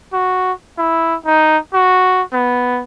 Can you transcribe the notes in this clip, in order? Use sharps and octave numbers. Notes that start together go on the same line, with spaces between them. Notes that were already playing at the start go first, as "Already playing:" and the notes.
F#4
E4
D#4
F#4
B3